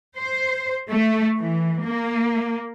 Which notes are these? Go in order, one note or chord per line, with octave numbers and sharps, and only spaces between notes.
C5
A3
E3
A#3